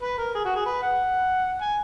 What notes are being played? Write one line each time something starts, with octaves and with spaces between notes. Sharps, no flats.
B4
A#4
G#4
F#4
G#4
B4
F#5
G#5